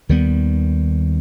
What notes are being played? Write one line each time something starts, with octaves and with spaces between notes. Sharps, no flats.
D#2 D#3 G3 B3